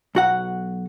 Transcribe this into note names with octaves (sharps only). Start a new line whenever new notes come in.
B1 F#4 F#5